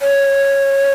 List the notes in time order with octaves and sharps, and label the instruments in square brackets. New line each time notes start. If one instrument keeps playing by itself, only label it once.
[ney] C#5